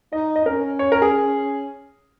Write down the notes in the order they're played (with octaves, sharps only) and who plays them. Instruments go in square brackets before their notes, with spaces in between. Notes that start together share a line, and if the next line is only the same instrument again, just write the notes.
[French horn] D#4 [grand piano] D#5
[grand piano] D#5
[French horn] C#4 [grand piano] A#4
[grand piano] C#5
A#4
G#4